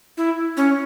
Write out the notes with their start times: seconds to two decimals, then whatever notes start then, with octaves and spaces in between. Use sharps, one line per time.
0.17 E4
0.57 C#4